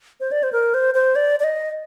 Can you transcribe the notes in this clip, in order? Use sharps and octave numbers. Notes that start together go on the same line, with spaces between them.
C5
D5
C5
A#4
C5
C5
D5
D5
D#5